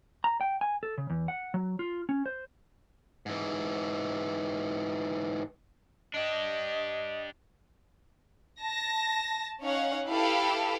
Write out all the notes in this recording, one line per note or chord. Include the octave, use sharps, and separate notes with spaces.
A#5
G5
G#5
A4
C#3
E2
F#5
F#3
F4
C#4
C5
G#2 E3
D4 G4 D#5
A5 A#6
C#4 D#4 C#5 F5 F#5
E4 G4 A4 B4 F5